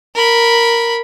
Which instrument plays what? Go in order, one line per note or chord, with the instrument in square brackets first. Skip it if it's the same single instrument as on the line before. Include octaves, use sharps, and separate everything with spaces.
[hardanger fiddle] A#4 B5